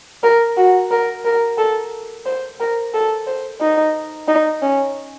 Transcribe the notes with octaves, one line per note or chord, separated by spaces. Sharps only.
A#4
F#4
A#4
A#4
A4
C5
A#4
A4
C5
D#4
D#4
C#4